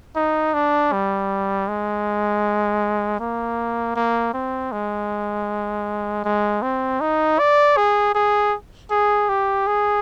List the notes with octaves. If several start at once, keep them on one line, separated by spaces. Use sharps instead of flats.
D#4
D4
G3
G#3
A#3
A#3
C4
G#3
G#3
C4
D#4
D5
G#4
G#4
G#4
G4
G#4